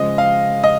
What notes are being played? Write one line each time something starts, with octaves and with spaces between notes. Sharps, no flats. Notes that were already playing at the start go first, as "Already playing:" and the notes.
Already playing: C#3 F3 G#3 D#5
F5
D#5